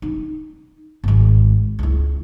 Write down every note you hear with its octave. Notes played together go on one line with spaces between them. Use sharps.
D#4
G#1 G#3
C#2 E4